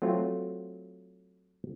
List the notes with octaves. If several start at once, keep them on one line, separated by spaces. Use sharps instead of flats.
F#3 A3 C4 F4